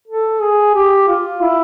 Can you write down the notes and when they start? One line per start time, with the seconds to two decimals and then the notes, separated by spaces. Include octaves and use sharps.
0.08 A4
0.41 G#4
0.75 G4
1.08 F4
1.42 E4